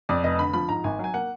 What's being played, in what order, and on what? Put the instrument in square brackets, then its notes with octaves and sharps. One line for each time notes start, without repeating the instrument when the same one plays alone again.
[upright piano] F2 D5
F1 D#5
D3 B5
F3 B5
G#2 A#5
G#1 G#5
F#3
G#5
A#3 F#5